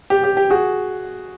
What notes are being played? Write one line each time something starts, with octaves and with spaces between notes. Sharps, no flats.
G4
G4
G4
F#4 G#4